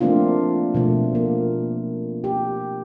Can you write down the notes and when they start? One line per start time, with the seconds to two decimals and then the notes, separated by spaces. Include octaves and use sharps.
0.01 F3 A3 A#3 C4 D4 F4
0.74 B2 F3 A3
1.15 A#3
2.24 G4